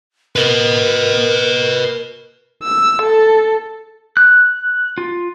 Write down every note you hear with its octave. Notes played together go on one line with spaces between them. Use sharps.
A#4 B4 D#5
E6
A4
F#6
F4